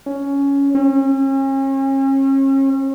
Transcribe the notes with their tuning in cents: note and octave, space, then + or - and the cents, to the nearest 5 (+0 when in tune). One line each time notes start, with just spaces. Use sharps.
C#4 +10
C#4 -40